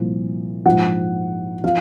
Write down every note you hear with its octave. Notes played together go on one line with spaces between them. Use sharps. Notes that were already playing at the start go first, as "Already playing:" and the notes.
Already playing: C2 A#2 F3
A#1 G#2 F3 F#5
F3 F5